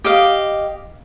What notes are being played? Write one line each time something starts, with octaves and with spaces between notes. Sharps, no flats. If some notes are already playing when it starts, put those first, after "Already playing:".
G4 D#5 F5